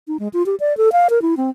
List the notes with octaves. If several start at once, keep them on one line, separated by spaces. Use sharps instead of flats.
D#4
G#3
F4
G4
D5
A4
F5
A#4
E4
C4